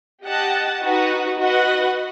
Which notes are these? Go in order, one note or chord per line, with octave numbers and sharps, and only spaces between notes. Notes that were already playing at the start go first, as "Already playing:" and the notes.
G4 D#5 F#5 A5
D#4 F#4 B4 F#5
F#4 B4 D#5 F#5